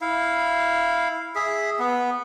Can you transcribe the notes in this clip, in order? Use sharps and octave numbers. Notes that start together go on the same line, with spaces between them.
E4 F5
G#4 E5
B3